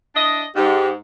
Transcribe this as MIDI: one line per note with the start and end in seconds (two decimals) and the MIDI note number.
0.16 0.45 62
0.16 0.45 64
0.16 0.45 75
0.56 0.94 44
0.56 0.89 67